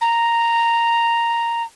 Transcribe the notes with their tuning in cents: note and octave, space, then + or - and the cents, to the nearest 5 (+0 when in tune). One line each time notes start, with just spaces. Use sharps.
A#5 -5